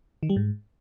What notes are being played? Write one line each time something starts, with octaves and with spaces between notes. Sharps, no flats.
D#3
G3
G#2